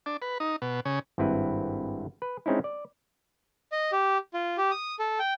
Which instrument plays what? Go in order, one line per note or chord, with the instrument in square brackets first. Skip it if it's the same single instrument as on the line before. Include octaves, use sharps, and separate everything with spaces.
[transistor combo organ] D4
B4
D#4
B2
C#3
[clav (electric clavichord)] G#1 G2 C4 E4 B4
B4
G#3 C4 C#4 D#4 E4
D5
[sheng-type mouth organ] D#5
G4
F4
G4
D#6
A4
G5